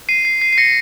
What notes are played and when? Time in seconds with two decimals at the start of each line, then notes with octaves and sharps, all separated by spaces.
0.09 C7 D#7
0.25 C7
0.41 C7
0.53 C7
0.58 A#6 C#7